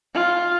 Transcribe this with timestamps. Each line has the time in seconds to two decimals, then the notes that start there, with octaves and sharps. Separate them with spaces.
0.14 F4